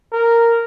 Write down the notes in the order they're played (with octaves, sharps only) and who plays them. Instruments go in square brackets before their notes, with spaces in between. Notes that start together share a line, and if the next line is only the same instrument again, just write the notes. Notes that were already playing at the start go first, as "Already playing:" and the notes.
[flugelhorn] A#4